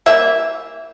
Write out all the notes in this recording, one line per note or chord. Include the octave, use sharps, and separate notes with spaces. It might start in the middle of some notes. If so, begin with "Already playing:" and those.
E3 G3 A#3 E5